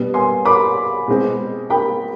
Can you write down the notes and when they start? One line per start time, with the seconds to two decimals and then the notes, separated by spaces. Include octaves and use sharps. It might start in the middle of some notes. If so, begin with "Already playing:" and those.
Already playing: B2 G3 B3
0.14 G#5 C6
0.45 B5 D6
1.08 B2 G#3 C4
1.70 G5 B5